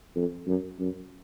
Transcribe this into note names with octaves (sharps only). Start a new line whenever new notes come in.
F2
F#2
F#2